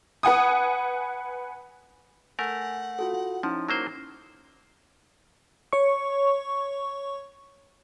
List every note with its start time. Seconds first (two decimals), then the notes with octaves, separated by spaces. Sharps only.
0.23 B4 F#5 G#5 D#6
2.39 A3 A#4 F#5 G#5
2.99 F4 F#4 A4
3.43 F3 C#4 D#4 E4
3.68 F#3 A#3 C5
5.73 C#5 C#6